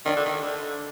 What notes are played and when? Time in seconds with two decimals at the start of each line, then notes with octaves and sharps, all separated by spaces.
0.06 D#3 D4
0.16 D3
0.25 D#3
0.42 D3